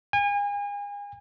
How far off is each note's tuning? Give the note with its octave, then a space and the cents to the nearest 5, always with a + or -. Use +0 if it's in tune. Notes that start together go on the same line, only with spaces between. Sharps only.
G#5 -35